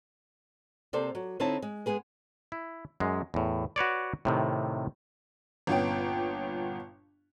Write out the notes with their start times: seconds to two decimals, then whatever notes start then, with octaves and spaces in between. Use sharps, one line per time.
0.93 C3 A#3 A4 C5 D5
1.15 F#3
1.40 D3 C4 D#4 E4 C#5 A5
1.62 G#3
1.86 G#3 B3 G#4 B4
2.52 E4
3.00 F#2 G#3
3.34 E2 A2
3.76 F#4 B4 C#5 D5
4.25 A2 C3 D#3
5.67 G1 A#2 B3 C#4 G5